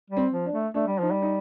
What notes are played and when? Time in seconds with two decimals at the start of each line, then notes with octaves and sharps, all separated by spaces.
0.10 G3
0.17 C4
0.32 F3
0.46 D4
0.53 A3
0.74 A3 D4
0.87 G3
0.99 F3 D#4
1.11 G3
1.22 D#4